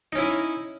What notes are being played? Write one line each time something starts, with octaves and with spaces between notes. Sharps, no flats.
C#4 D#4 E4